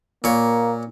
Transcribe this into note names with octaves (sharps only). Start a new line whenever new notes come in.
A#2 A#3 C#5